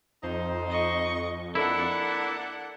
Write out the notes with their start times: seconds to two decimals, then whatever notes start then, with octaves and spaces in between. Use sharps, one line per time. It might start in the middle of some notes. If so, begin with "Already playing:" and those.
0.23 F2 D#4 C5
0.69 D#5 C#6
1.55 A#3 D4 E4 A4 F#5